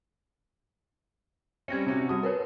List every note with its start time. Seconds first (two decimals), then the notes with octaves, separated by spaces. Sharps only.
1.68 G3 C4 C#4 G#6 A#6 C#7
1.86 C3 C#4 F#4
2.09 G3 F#4 A5 D#6
2.23 A#4 B4 C#5